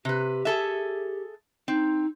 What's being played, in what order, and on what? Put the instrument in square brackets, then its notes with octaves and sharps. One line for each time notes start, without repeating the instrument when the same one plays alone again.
[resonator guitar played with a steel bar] C3 B4 [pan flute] G4
[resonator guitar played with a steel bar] G#4 A4 E5
[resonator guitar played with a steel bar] C4 [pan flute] D#4